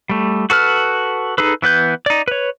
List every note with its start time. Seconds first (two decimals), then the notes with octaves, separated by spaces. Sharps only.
0.09 G3 A3
0.50 F#4 A4 B4 F6
1.38 D#4 G#4 A4 B4
1.62 E3 B3 B4 G6
2.06 D#4 D5
2.28 B4 C#5